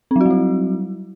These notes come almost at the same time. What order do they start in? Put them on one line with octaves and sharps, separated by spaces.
C4 F#3 F#4 G3 E4